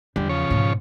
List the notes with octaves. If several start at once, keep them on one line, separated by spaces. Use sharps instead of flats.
E2 D3 G3
C#3 F3 C#5
G#2 B2